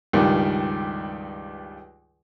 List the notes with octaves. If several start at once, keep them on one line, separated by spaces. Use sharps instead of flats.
C#2 G2 D#3